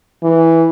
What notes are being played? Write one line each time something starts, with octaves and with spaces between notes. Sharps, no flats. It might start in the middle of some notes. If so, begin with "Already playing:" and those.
E3